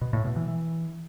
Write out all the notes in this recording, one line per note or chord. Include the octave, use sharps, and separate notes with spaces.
B2
A2
B2
E3
E3